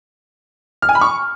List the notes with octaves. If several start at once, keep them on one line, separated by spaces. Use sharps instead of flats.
F6
G#5
B5
C#6